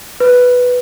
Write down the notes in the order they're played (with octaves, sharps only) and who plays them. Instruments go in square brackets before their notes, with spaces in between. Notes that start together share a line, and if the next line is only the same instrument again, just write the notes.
[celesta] B4